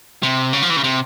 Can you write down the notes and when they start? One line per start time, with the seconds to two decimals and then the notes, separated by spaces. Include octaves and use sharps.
0.23 C3
0.53 C#3
0.62 F3
0.70 E3
0.77 C#3
0.84 C3